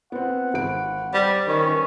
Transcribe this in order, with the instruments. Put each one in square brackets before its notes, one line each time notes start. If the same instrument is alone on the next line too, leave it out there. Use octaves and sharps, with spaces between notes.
[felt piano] B3 C4 [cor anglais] F#5
[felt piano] G#1 D7
[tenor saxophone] G3 [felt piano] C5 D5
[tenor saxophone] D#3 [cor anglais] C#4
[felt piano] B4